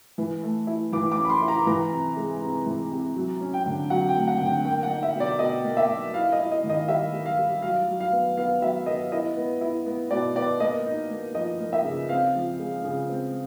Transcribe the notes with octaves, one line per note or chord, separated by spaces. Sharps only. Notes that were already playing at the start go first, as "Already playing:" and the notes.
E3
A3
E4
E3 D6
D6
C#4
B5
C6
E4
A#5
E3 A#5
C3
G#3
C3
E3
C3
F#3
C#4
G5
D3
F#3 F#5
G5
A3
F#5
D3
G5
A#3 G5
F#5
D#4
E5
B2
D5
B2 D#5
A#3
E5
A#3
E4 F5
D#5
E4
D#5
D#3
D#5
G3 E5
G3
F5
G3
F#3 F5
F#3
F5
B3
B3 F5
F#3 E5
B3 D#5
E4 D#5
B3
E4
B3
B2 D5
B3 D5
A#3 D#5
D#4
A#3
F3 D#5
A#3
E5
C#3
C4 F5
F3
G#3
C#3
C4